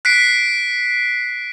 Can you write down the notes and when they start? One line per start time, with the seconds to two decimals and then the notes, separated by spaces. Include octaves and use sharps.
0.05 F#6 B6 C7 D7